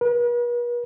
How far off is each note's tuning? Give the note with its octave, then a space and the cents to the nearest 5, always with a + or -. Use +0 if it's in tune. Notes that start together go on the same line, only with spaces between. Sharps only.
B4 -45